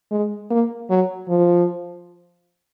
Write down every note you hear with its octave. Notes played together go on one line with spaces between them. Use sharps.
G#3
A#3
F#3
F3